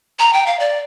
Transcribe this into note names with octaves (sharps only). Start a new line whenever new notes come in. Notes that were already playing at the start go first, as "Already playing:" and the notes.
A#5
G5
F5
D5